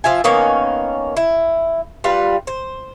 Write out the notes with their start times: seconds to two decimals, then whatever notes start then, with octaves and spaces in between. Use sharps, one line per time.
0.04 F3 F4 E5 G#5
0.24 D#3 A#3 B3 C#4
1.17 E4
2.04 G3 F4 B4
2.47 C5